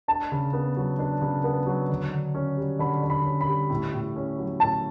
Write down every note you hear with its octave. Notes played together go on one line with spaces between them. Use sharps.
D4 A5
C#3
B3
F#3
D4
C#3
B3
F#3
D3
D3
C#4
G3
D3 B5
D3
B5
C#4
B5
G3
A2
A2
C#4
F#3
A2 A5